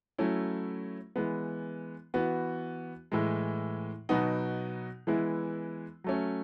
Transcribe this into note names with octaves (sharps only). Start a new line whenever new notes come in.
F#3 A3 C#4 E4
E3 G#3 B3
E3 B3 F#4
A2 E3 G#3
B2 F#3 B3 D#4 F#4
E3 G#3 B3 E4
F#3 A3 C#4